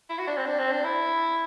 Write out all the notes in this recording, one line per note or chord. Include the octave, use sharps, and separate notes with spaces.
E4
F#4
D4
C4
D4
C4
D4
E4